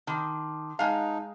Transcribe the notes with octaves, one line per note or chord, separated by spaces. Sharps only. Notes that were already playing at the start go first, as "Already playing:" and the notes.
D#3 A5 C6 D6
G#3 D#4 F5 A5